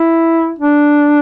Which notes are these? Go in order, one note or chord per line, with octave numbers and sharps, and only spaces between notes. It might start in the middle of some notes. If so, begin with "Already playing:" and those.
Already playing: E4
D4